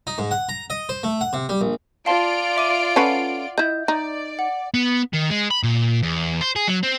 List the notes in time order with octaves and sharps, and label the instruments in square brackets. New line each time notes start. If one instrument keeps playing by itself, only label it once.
[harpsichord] D#4
G#2
F#5
A#5
D#5
C5
A3
F#5
C3
G3
A#1
[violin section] F4 D5 D7 [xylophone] F5 A5 C6
[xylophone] E5 D6 D#7
[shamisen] C#4 A4 B4 [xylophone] F#5 C7 D#7
[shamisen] E4 D#5 [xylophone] G6
[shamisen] D#4 [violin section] D5
[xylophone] F#5
[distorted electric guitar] B3
D#3
G#3
B5
A#2
E2
C5
G#4
F#3
C4